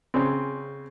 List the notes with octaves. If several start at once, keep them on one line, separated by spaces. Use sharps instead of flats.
C#3 C4